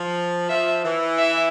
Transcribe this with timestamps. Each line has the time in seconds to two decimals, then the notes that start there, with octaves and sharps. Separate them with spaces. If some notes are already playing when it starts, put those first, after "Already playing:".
Already playing: F3
0.49 F3 E5
0.84 E3
1.18 E5